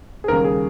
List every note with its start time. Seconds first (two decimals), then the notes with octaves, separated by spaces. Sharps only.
0.24 G#4
0.28 D#2 A#4
0.31 C#3 G3
0.44 G#4